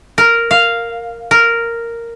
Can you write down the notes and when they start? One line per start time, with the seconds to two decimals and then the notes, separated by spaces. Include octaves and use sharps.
0.18 A#4
0.51 F5
1.31 A#4